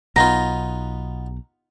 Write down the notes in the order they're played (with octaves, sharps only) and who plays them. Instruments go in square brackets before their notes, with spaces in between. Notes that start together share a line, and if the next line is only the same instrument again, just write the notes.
[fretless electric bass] B1 [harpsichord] B3 D#4 F4 [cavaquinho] A#5